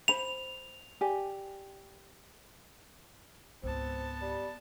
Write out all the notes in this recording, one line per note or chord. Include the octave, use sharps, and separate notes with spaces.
C5 B5 F7
G4 D5 G#5
C#2 G#2 B3 C4 A5
G3